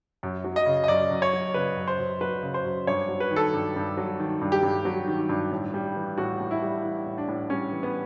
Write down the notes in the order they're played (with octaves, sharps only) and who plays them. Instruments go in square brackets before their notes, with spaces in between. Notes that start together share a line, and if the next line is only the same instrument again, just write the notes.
[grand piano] F#2
F#3
D#5
C#3
D#5
F#2 D5
F#2
C#5
F#3
C#3 B4
F#2
C5
F#2
F#3 B4
C#3
C5
F#2
G2 C#5
F#3
B4
D#3
A4
G2
G2
F#3
D#3
G2
G4
G2
F#3
D#3
G2
A2
G3
E3
A2 F#4
A2
E4
G3
E3
A2
D4
A2
G3 C#4
E3
B3